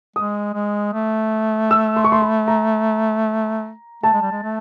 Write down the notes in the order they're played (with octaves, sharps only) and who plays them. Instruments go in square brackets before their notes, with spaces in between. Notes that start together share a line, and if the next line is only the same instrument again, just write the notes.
[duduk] G#3 [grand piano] D#6
[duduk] G#3
A3
[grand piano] E6
C6
C#6
C6
B5
A#5
[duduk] A3 [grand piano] A5
[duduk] G#3
G3
G#3
A3